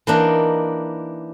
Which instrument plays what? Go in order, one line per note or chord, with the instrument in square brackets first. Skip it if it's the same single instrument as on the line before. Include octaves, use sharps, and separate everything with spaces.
[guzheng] E3 A#3 D4 D#4